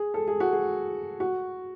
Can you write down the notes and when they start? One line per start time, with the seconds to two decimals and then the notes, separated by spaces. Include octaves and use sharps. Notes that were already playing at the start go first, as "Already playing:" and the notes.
Already playing: G#4
0.14 A4
0.27 G#4
0.40 F#4
0.53 G#4
1.20 F#4